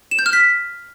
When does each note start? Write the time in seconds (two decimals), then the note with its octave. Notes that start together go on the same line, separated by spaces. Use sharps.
0.11 E7
0.19 G6
0.26 F6
0.33 B6